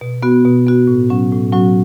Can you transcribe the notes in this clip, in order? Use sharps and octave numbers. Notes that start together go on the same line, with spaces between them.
B2
B3 F#4
B2
B3 F#4
A2
F#3 C#4 F#4
A2
F#3 C#4 F#4